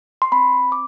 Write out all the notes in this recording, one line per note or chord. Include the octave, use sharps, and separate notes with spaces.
C6
C4 B5
D6